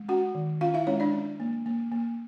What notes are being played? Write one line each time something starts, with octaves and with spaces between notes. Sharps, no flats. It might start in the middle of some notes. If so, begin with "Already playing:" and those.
Already playing: G#3
C#4 F#4 F#5
D#3
C#4 F4 F5
E4 E5
G#3 C#4 C#5
D4 D5
C#4
A#3
A#3
A#3